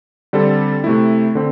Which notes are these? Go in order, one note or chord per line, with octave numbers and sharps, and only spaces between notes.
D3 G3 C4 A4
C3 A3 E4
D3 C4